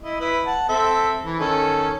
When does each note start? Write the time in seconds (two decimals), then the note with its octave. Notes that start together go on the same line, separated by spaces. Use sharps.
0.03 E4 D#5
0.20 E4 B4
0.46 F#5 A5
0.69 C4 A4 E5
1.25 E3
1.40 D#3 C#4 A4